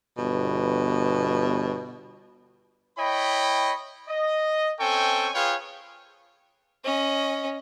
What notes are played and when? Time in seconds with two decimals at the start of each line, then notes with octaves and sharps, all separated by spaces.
0.18 G1 B2
2.98 E4 C#5 D#5 G5 B5
4.09 D#5
4.80 C4 C#4 A4 G5 G#5 C#6
5.34 F4 G#4 B4 C#5 F5 G5
6.85 C#4 D#5